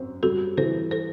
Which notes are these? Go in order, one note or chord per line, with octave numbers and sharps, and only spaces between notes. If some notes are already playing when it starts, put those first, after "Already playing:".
Already playing: F#2 C4
G3 F#4 A4
E3 A4 C5
A4 C5